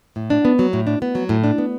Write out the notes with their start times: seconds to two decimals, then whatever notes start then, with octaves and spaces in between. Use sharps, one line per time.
0.16 A2
0.30 D4
0.45 B3
0.59 F#3
0.73 A2
0.87 D4
1.02 B3
1.15 F#3
1.29 A2
1.44 D4
1.58 B3